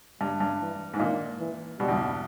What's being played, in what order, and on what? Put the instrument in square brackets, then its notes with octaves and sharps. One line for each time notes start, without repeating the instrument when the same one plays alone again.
[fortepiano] G2 [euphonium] G3
[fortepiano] G2
[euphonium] E3
[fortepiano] G#2
[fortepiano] A#2 [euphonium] D#3
[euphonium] E3
[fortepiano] B2 [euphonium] G3
[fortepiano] E2
G2